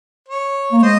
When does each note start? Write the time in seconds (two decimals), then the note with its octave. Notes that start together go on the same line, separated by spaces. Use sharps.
0.28 C#5
0.72 A#3
0.78 C#5
0.82 G#3 C5 D#5